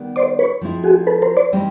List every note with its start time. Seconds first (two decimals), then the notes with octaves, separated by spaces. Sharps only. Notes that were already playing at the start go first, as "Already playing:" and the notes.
Already playing: D#3 G3 B3
0.16 C5 D5
0.39 B4 C#5
0.61 F3 G#3 C4 E4
0.84 F#4 G#4
1.07 A4 B4
1.22 A#4 C5
1.37 C5 D5
1.52 E3 G3 C4 D#4